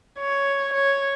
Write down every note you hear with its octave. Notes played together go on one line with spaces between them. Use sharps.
C#5
C#5